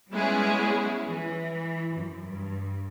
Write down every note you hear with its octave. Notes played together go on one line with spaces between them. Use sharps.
G3 G#3 B3 C#4 E4 G#4
E3
F#2
G2